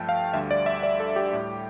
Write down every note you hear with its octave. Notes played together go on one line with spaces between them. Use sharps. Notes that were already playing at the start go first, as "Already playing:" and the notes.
Already playing: G2 F3 A3 G5 A5
F5
D2 D3 G3 E5
D5
E5
D5
A4
G4
A2 G3